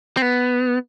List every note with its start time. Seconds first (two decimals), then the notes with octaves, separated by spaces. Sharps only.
0.17 C4
0.22 B3